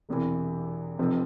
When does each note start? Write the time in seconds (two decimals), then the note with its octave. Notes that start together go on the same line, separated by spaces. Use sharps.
0.09 E1 E2 C3 E3
0.99 F1 F2 C3 F3 C4